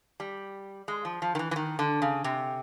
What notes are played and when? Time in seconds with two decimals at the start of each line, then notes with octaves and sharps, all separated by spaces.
0.20 G3
0.88 G#3
1.05 F3
1.22 F3
1.35 D#3
1.39 E3
1.51 E3
1.56 D#3
1.79 D3
2.02 C#3
2.24 C3